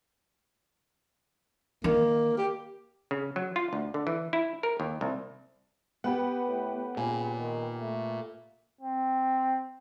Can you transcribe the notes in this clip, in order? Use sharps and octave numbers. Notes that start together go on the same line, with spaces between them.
D#3 A#3
G4
C#3
F#3
F4
D2
D3
E3
E4
A#4
D#2
C2
B3 G4 B4 F#5
A2
A#2 C#3 G#5
D#3
A3
C4